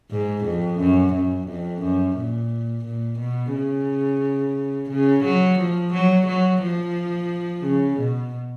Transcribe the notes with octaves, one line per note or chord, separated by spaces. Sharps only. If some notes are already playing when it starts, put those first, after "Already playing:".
G#2
F2
F#2
F#2
F2
F#2
A#2
A#2
B2
C#3
C#3
F#3
F3
F#3
F#3
F3
C#3
B2